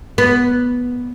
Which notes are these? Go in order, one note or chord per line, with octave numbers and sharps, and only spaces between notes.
B3